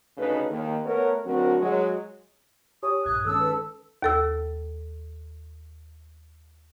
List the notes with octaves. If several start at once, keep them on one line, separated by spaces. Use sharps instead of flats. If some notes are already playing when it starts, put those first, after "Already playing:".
D2 C#3 D#4 A4 B4
D#2
A3 B3 A#4 B4 C#5
D2 F#3 C4 D4 F#4 A#4
F#3 G#3
G4 C#5 G#5 D#6
A#1 G2 F#6 G#6
D#3 G#3 C#4 A4 E6
B4
D#2 A4 E6